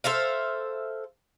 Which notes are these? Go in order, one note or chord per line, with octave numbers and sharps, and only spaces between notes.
A4 C5 E5 F5